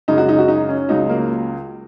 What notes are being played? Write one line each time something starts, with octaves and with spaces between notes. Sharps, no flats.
F#2 C#3 G#3 D#4
F#4
D#4
F#4
D#4
C#4
C#2 C#3 F#3 D#4
A#3